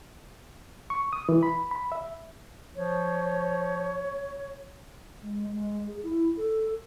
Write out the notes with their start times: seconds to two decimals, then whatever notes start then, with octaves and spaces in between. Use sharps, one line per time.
0.90 C#6
1.13 D#6
1.29 E3
1.43 B5
1.71 B5
1.92 E5
2.75 F3 C#5
5.22 G#3
5.52 G#3
5.88 G#4
6.03 E4
6.37 A4